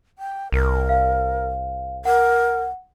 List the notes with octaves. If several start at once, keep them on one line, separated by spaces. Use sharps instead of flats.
G5
C2 A#4
F5
A#4 F#5